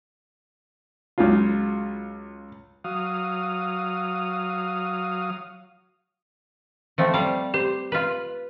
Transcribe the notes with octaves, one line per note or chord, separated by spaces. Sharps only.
C#2 F#3 C#4 F4
F#3 F5 D#6
F3 A3 C4
G3 D5 F5 D6
G4 C5
F4 B4